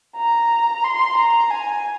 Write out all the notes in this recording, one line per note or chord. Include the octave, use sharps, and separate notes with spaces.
A#5
C6
A#5
G#5